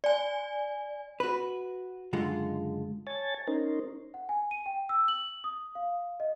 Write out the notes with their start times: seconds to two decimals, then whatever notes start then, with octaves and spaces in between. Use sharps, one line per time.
0.04 D5 G#5
1.20 F#4 B4
2.13 C#2 F#2 D3 G#3 F4 F#5
3.07 C#5 G#5 A5 A6
3.47 C#4 D#4 A#4 C5
4.14 F#5
4.29 G#5
4.51 D#7
4.66 G5
4.89 E6
5.08 F#7
5.44 D#6
5.75 F5
6.20 D#5